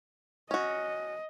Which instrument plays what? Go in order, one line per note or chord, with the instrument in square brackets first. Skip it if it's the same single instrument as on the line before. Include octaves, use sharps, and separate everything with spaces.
[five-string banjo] C#4 F#4 [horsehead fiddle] D#5